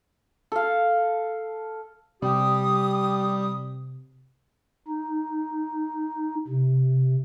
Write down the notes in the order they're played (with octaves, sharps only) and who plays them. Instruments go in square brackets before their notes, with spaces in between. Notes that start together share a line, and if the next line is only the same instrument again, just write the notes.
[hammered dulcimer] A4 F5
[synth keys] C3 [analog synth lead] G3 [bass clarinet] G4 [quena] D#6
[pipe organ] D#4
C3